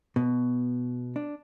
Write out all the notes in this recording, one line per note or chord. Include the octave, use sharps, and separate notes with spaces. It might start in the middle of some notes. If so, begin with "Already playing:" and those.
B2
D4